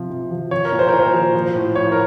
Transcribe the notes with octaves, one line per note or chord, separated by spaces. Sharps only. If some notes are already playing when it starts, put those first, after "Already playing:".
Already playing: C3 F3
C3
F3
F3 C#5
A#4
A#2
C5
A#2 A#4
C5
F3
F3
A2
A2 C#5
A#4